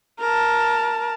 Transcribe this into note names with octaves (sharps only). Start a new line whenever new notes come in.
A#4 A5